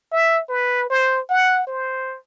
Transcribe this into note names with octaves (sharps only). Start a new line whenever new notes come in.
E5
B4
C5
F#5
C5